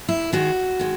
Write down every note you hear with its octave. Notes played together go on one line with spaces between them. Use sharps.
E4
D#3 G#3 F#4
D#3 G#3